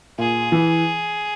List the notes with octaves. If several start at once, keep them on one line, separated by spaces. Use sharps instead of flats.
A#2 G#4
E3